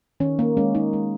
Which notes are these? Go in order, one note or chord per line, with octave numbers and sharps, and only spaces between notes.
D#3 C#4
A#3
G#3 C#4
D#4
G#3